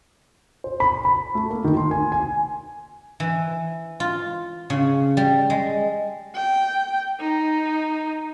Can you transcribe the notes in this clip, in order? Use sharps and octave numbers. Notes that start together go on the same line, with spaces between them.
C5
B5
B5
A3
A#3
D#3
C6
G#5
G#5
E3
F4
C#3
G3
G#3
G5
D#4